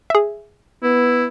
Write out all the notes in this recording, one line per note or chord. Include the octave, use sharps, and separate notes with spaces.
G#4 E5
B3 E4